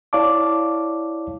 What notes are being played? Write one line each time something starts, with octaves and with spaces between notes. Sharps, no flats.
E4 C#5 D5 F5 A5 D6